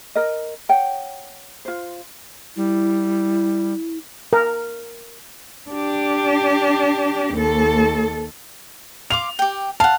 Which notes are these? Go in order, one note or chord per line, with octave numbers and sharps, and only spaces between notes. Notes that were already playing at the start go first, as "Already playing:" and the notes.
A#4 D#5
C#5 F#5 G5
F4 C5
G3 E4
A#4
D4 G4
D#2 A4
F5 C6 D6 F7
G4 G5
F5 F#5 A5